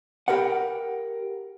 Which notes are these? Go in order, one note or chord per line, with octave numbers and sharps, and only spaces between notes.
G4 A#4 B4 F#5